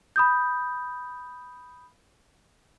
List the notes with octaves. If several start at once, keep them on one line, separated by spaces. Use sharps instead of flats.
B5 D#6 G6